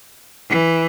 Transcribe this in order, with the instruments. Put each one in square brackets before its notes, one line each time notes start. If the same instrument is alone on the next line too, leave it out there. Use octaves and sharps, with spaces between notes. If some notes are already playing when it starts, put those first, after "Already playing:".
[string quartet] E3